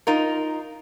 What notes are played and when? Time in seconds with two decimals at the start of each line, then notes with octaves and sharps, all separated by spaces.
0.07 D#4 F4 A#4